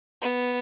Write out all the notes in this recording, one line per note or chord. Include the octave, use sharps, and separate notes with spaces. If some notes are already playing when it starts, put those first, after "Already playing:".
B3